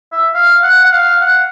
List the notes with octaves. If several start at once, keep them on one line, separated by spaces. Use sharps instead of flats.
E5
F5
F#5
F#5
F5
F#5